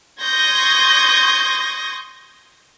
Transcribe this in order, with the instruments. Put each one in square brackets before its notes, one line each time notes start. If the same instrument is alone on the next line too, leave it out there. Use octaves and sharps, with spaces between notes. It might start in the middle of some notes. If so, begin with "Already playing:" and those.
[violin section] C6 C#6 D#6 G6 G#6 A#6